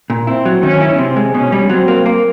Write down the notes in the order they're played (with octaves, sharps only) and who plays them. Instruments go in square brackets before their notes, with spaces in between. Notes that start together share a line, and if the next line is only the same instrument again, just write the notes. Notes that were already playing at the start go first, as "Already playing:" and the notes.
[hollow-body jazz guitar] A#2
[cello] C4 [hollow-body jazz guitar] E4
[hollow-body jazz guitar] F#3
[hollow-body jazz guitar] D#3 [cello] C#4
[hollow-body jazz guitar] E4
[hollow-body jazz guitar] C3 [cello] C4
[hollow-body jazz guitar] G#3
[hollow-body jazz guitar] B2 [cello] C#4
[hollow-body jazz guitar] G3
[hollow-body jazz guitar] F#3 [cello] C4
[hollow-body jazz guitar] A#3
A#3